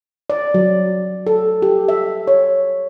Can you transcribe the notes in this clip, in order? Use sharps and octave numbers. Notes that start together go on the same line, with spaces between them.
D5
F#3
A4
G4
E5
C#5